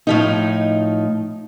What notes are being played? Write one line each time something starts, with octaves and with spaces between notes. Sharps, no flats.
A2 F3 D#4